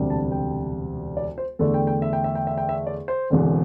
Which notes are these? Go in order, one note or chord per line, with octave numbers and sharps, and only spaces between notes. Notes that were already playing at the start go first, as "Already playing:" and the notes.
Already playing: E1 D2 C3 G3 D4
A5
G5
D5
C5
E2 D3 A3 D4 A4
G5
G5
E5
G5
E5
G5
E5
G5
E5
D5
C5
E1 E2 D3 C4